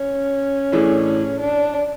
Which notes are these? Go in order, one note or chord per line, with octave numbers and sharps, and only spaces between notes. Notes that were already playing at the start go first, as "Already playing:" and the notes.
Already playing: C#4
A2 E3 A3 D4 G#4
D4